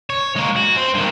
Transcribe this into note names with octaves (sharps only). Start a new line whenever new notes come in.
C#5
G#3 A#3
F#4
C4
G2 D#3